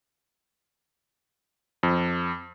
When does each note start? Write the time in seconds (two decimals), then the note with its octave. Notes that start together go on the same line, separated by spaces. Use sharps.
1.83 F2